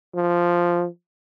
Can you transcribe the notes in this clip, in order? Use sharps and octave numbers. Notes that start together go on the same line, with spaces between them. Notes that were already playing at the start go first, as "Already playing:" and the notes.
F3